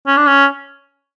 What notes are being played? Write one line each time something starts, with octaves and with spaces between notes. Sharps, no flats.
C#4
D4
C#4